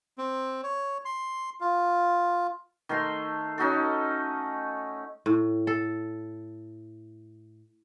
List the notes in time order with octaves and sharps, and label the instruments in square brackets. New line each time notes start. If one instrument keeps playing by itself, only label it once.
[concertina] C4
C#5
C6
F4
[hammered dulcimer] D#3 A3 A#5 C6
C#4 D#4 F#4 A4
[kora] A2
A4